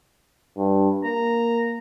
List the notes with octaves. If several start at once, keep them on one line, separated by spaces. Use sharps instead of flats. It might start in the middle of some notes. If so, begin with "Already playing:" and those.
G2
A#3 A#5